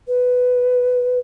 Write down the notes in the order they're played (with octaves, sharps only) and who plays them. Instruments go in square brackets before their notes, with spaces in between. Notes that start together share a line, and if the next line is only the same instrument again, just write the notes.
[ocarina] B4